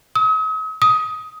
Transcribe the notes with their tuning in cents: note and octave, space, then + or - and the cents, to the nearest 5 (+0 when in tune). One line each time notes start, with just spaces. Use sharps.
D#6 +45
D#6 +20